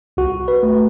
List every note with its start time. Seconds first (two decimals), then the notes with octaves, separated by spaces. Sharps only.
0.17 C2 F#4
0.48 B4
0.63 A3